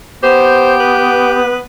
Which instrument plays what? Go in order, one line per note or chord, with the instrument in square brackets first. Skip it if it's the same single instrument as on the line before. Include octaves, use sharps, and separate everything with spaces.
[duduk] B3 [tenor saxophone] G4 [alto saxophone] C5
[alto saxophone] B4